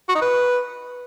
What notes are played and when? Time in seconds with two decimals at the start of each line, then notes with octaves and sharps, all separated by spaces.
0.09 F#4
0.15 D#4
0.22 B4